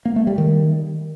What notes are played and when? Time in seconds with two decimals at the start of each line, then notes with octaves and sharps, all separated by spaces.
0.05 A#3
0.16 A3
0.27 G3
0.38 D#3